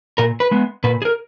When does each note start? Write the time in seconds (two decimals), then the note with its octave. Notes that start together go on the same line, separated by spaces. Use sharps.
0.18 A#2 A#4
0.40 B4
0.51 G#3 B3
0.84 A#2 B4
1.02 G#4
1.05 A#4